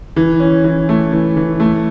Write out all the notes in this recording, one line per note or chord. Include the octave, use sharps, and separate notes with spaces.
E3
C#4
E3
A3
E3
E3
A3